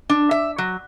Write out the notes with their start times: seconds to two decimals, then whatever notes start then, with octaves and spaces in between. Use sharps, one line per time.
0.09 D4
0.31 E5
0.58 F#3